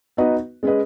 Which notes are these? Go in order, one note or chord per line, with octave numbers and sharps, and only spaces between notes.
B3 D#4 F#4 B4 D#5
G#3 C#4 G#4 B4 D#5